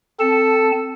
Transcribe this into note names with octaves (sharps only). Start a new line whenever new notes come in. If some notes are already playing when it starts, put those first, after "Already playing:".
C4 A4 A5